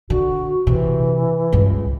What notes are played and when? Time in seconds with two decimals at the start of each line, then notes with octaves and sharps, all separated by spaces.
0.10 D3 F#4
0.67 C3 E3
1.53 C#2 G2